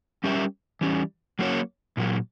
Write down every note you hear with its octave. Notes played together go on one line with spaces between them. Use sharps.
G3 C#4 G4 A#4 E5
E3 G3 C#4
F#3 A#3 C#4 F#4 C#5
A#2 F#3 A#3